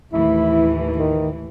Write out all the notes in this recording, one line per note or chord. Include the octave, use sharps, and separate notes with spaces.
D#2 A2 E3 E4
D#3